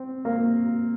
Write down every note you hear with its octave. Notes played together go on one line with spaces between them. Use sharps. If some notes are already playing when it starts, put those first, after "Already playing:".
Already playing: C4
A#3